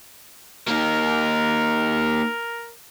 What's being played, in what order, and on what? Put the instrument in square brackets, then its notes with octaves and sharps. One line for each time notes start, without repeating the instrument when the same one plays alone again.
[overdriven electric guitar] A#3 D#4 [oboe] A#4